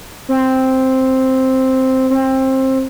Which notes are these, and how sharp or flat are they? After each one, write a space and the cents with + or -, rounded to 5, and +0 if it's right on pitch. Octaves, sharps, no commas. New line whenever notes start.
C4 +0
C4 +20